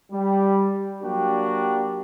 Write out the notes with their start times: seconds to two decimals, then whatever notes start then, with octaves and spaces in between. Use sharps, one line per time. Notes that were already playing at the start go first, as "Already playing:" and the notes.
0.12 G3
1.02 F#3 A#3 D4 F#4 G4